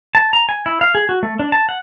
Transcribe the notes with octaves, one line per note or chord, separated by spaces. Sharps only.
A5
A#5
G#5
E4
F5
G#4
F#4
A3
D4
A5
F#5